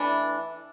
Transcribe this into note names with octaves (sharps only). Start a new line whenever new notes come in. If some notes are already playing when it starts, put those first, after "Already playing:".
Already playing: E3 A3 D4